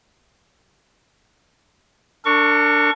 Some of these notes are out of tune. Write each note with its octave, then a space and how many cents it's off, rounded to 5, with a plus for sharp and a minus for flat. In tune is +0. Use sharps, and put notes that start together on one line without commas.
D4 +0 A#4 -45 C#6 +0